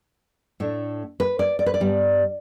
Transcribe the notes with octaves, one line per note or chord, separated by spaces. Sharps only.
A2 A3 D4
B4
D5
D5
B4
D5
G2 G3 B3